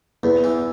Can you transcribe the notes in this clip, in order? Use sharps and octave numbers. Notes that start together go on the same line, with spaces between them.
E2 B3
E3